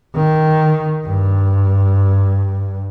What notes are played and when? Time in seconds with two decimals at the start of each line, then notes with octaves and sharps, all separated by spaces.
0.15 D#3
1.07 G2